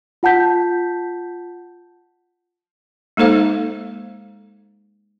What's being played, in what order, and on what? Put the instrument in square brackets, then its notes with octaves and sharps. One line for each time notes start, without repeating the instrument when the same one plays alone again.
[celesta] F4 F#5 A5 G6 B6
[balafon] G#3 A#3 D#4 A4 C5 F5